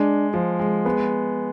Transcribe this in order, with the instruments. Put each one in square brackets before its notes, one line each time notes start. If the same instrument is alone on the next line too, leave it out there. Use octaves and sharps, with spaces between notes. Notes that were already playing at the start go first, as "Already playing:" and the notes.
Already playing: [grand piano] G#3 [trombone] D4
[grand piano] F3
G#3
G#3 B3